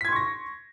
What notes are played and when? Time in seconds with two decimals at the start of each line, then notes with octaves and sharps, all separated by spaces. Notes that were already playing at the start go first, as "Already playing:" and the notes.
0.01 B6
0.05 G#6
0.08 C6
0.12 C#6
0.16 A#6